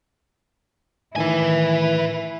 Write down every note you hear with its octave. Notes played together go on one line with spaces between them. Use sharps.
A2 D#3 E3 E4 B4 G#5